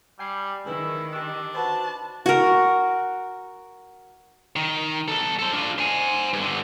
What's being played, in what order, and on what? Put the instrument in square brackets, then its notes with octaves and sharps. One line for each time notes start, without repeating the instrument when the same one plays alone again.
[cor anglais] G3 [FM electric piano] G5 G#5 C7
[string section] D#3 [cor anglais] E4 [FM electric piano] G#4 B4
[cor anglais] D4 [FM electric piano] G4 D6 E6
[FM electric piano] F#4 B4 C5 [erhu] A5
[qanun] F#4 A#4
[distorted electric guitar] D#3
B1 A4
A4 C5
D4 F4
C5 G#5
G2 D3